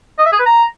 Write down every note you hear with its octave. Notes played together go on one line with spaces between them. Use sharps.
D#5
E5
G#4
B4
A#5